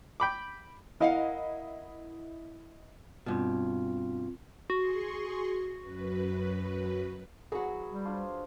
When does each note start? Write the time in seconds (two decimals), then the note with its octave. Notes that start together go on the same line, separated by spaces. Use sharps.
0.20 G5 B5 D6
1.00 E4 A#4 D#5 F5 F#5
3.26 G2 B2 C4 F4
4.70 F#4 G#4 C6 C#6
5.81 F#2 B4
7.52 F#3 E4 F#4 G#4 B4
7.90 G3
8.05 D4 F4 C5